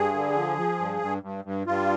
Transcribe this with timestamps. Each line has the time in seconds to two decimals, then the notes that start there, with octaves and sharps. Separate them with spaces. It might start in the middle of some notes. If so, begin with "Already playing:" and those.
Already playing: G2 G#4
0.14 D3
0.36 F3
0.58 F3
0.79 G2
1.01 G2
1.23 G2
1.44 G2
1.67 G2 F4